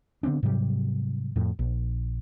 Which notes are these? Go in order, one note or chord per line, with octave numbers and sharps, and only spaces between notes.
D3 B3 C4 D4
G#2 C3 F#3 G3
F2 A2
A#1